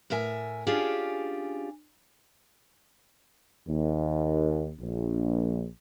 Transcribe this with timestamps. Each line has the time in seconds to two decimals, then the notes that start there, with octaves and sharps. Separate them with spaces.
0.10 A2 A#4 E5 G#5
0.67 C#4 D4 F4 G4 G#4
3.69 D#2
4.81 A#1